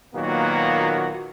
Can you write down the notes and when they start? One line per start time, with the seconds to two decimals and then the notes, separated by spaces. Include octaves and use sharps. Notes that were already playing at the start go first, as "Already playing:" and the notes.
0.15 A#2 D#3 F#3 A#3 B3 F#4